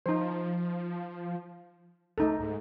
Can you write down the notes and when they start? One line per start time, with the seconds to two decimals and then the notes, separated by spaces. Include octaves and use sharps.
0.06 F3 D#4 C5
2.18 C#2 A3 D#4 A4
2.40 G#2